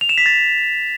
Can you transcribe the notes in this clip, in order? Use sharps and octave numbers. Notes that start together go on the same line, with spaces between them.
F7
E7
B6
A6